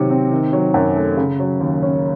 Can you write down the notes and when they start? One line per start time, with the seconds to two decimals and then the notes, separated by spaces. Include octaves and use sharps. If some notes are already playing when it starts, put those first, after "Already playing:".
Already playing: C3 D#3 F#3
0.10 C4
0.32 D#3
0.53 F#3
0.74 F#2
0.96 A3
1.17 C#3
1.40 F#3
1.61 D#2
1.83 C#4